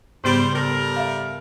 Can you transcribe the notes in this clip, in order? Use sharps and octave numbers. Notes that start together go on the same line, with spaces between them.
G#2 C#3 G3 B3 C5
G3 A4 A#4
E5 F5